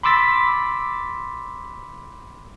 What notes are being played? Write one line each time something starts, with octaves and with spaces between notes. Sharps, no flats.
B5 C6 D6 E6 A6 B6